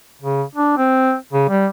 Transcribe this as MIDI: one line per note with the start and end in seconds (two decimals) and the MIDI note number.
0.22 0.43 49
0.55 0.72 62
0.77 1.15 60
1.33 1.45 49
1.49 1.67 55